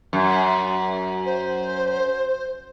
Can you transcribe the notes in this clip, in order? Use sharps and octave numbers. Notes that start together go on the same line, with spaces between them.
F#2
C5